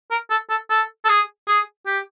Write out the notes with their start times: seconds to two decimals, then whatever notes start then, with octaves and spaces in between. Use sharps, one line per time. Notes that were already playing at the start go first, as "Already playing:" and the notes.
0.11 A#4
0.30 A4
0.50 A4
0.70 A4
1.05 A4
1.09 G#4
1.48 G#4
1.86 G4